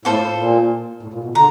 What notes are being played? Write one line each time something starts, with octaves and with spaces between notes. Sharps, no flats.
A2 F4 A4 C5
A#2
A2
A#2
B2
D3 A#5